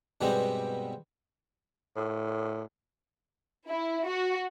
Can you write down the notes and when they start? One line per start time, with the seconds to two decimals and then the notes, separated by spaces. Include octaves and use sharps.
0.21 G2 B2 G3 G#3 B3 C4
1.96 A2
3.68 E4
4.07 F#4